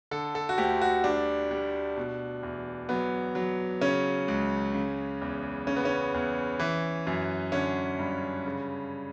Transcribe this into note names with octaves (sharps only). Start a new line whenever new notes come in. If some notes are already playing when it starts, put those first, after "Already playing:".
D3 A4
A4
F#4
D2 G4
F#4
G3 D4
G3
B2
E2
F#3 B3
F#3
C#3 C#4
C#2
C#3
E2
C#3 C#4
B3
C#4
E2
E3
F#2
D3 C#4
G2
C#3